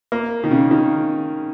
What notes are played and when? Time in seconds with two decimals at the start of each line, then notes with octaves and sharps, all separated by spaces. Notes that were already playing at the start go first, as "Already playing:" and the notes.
0.12 A#3
0.44 D#3
0.51 C#3
0.71 D#3